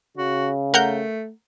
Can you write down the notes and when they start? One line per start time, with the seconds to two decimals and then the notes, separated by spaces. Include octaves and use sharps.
0.17 C#3 F#4
0.74 A3 A#4 F#5 G6